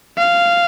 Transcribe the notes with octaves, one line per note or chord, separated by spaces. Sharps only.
F5